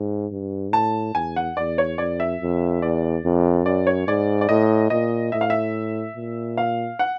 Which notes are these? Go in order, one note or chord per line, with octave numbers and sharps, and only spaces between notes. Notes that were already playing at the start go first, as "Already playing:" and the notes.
Already playing: G#2
G2
A2 A5
E2 G#5
F#5
E2 D5
C#5
F2 D5
E5
F2
E2 D5
F2
F#2 D5
C#5
G#2 D5
D5
A2 D#5
A#2 D#5
A2 E5
F5
E5
A#2
F5
F#5